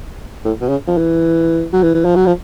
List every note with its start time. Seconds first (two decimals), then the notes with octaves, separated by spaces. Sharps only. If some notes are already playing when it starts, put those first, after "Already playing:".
0.45 A2
0.61 B2
0.68 C#3
0.88 F3
0.97 E3
1.73 F#3
1.83 E3
1.94 E3
2.05 F3
2.16 F#3
2.26 F3